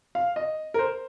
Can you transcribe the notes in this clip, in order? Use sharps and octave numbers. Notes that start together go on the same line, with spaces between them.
F5
D#5
A#4
C5